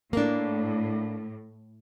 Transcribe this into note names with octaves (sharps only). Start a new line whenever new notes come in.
A2 A#3 D4